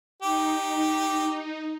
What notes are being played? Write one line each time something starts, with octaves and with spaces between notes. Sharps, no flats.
D#4 G4